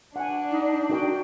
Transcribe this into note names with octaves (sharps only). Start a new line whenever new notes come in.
D4 F#5 G#5
D#4
D#4 F#4 A#4 G5